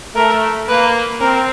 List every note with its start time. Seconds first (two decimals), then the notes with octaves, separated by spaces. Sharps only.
0.15 A3 A#4
0.68 A#3 B4
1.21 C4 A#4